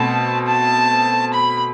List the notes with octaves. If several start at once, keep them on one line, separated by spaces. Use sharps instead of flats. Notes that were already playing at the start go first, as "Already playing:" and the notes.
Already playing: B2 A3 C4 A5
A5
B5